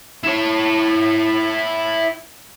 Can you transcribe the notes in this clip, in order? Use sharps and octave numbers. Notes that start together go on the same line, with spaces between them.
E4 C#5